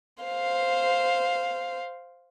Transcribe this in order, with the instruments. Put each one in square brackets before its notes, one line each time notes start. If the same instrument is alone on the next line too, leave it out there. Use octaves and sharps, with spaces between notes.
[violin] C5 F5